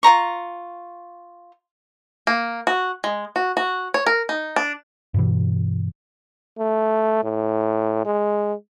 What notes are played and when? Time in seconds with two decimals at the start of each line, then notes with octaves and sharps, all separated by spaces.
0.03 F4 A#4 A#5 C#6
2.27 A#3
2.67 F#4
3.04 G#3
3.36 F#4
3.57 F#4
3.94 C#5
4.06 A#4
4.29 D#4
4.56 D4
5.14 G2 B2 E3
6.59 A3
7.24 A2
8.05 G#3